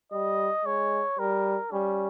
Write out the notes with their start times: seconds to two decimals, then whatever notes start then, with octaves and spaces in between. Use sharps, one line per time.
0.12 G3 D#5
0.65 G#3 C#5
1.19 G3 A#4
1.72 G3 C#4